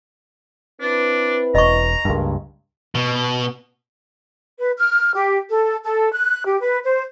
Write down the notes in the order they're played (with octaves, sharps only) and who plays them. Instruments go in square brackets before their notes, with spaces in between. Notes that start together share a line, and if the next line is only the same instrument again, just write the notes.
[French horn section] C4 E4 B4 [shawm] D4
[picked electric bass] E1 [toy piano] D#5 C#6 [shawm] A#5
[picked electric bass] C#2 G2 [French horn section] A#3
[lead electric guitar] B2
[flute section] B4
F6
G4
A4
A4
F#6
G4
B4
C5